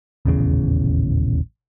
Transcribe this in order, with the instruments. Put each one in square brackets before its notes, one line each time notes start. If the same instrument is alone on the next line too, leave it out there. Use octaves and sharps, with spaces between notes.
[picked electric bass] D#1 A1 E2 C#3